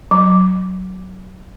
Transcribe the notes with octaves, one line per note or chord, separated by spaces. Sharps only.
F#3